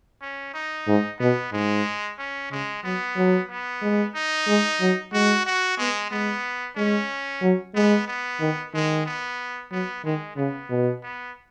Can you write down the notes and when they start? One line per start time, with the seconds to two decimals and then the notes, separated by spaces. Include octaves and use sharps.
0.21 C#4
0.54 D#4
0.87 G#2
1.19 B2 B3
1.52 G#2 G#3
2.18 C#4
2.51 C#3 G#3
2.83 F#3 B3
3.16 F#3
3.49 B3
3.82 G#3
4.15 D#4
4.47 G#3
4.80 F#3
5.13 G#3 F#4
5.46 F#4
5.78 G#3 B3
6.11 G#3 B3
6.76 G#3 C#4
7.42 F#3
7.75 G#3 B3
8.07 B3
8.40 D#3
8.73 D#3 G#3
9.06 B3
9.71 F#3 B3
10.04 D#3 G#3
10.37 C#3 B3
10.70 B2
11.02 B3